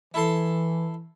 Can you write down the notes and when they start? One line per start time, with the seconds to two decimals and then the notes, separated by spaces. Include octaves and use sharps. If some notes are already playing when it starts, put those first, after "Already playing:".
0.14 E3 E4 A4 C6